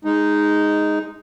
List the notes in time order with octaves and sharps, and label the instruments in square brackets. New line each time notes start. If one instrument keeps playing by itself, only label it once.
[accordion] G#3 D#4